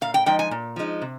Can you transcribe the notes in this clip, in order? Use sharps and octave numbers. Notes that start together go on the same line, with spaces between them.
A#2 F5
G5
F3 G#3 D#4 G5
G#5
A#2
F3 G#3 D#4
C3